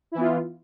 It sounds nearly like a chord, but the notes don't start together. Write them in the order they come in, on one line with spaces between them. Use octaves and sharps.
E4 E3 B3 F4